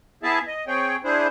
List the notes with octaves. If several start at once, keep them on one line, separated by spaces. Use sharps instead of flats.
B3 E4 G#4 E5 A5
D#5
C4 G#4 C#5 G5
D4 E4 G#4 C5